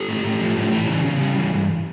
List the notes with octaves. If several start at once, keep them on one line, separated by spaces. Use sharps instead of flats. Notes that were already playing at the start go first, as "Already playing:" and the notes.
Already playing: G4 A4
A2
A2
F3
A2
E3
C#3
C#3
G3
E3
G2